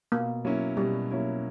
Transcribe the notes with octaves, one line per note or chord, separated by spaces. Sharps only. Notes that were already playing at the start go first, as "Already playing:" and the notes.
B2 A#3
F#3 A#3 C#4 E4
B2 G3
F#3 A#3 C#4 E4